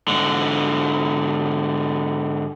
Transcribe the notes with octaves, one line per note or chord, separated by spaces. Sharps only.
G#2 D3